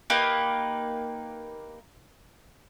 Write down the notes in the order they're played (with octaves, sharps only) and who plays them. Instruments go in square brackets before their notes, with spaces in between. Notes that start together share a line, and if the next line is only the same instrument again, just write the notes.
[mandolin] A#3 D#4 G4 B4